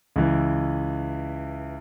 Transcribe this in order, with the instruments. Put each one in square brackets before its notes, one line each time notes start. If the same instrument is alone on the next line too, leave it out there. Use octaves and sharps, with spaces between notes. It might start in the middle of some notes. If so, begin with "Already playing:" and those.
[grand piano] C#2 E3